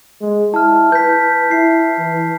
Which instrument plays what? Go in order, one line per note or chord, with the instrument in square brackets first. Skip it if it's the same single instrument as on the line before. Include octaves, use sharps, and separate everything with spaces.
[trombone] G#3
[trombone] E4 [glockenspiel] A5 F6
[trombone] B4 [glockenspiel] G6 B6
[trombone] E4 [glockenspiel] C7
[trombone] E3